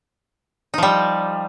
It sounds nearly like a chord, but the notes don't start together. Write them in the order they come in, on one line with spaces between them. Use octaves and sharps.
D#4 F3 G3